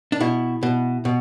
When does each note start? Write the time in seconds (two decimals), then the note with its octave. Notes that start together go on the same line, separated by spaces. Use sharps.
0.12 D4
0.20 B2 E4
0.63 B2
1.05 B2